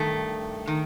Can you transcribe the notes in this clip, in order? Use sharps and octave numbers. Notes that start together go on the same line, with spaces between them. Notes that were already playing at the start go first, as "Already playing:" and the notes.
Already playing: G2 D#3 A3
D#3